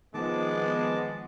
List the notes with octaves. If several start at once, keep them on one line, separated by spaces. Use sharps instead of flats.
D#3 F3 G#3 B3 A5 D6